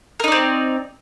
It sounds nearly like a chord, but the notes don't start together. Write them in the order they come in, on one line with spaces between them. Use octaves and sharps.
A#4 D#4 D5 C4